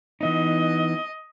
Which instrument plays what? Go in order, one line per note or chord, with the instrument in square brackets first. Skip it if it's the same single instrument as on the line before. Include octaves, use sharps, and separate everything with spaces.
[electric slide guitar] E3 B3 D#4 [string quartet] D#5